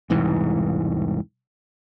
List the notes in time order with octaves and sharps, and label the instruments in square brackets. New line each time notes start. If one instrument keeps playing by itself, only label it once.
[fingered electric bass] E1 C2 G#2 E3